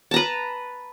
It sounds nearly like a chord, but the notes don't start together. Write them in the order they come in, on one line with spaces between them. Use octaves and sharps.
A5 A#5 B4